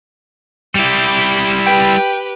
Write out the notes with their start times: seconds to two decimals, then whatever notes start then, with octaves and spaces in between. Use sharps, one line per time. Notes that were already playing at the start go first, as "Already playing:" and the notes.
0.75 G3 E4 D6 G6
1.66 G4 B4 G5